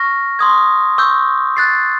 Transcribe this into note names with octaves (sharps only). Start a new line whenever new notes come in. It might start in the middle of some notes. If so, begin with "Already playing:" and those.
Already playing: C#6 F6 A#6
C6 D#6 G#6
C#6 E6 G6
F#6 A6 C7